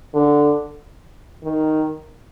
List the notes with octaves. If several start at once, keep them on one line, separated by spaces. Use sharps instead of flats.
D3
D#3